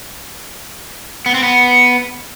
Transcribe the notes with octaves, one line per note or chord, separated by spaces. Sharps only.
B3
C4
B3